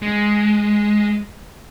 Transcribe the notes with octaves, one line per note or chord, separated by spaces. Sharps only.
G#3